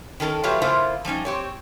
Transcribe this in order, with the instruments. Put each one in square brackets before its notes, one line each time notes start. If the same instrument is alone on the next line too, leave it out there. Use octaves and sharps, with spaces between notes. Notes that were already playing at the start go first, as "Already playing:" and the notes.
[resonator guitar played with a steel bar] D#3 C#4 A4 A#4
F#3 A3 F4 G4 B4 C#5
C#3 A#3 E4 F4 C5
F3 G3 C#4 D#4
C4 G4 C#5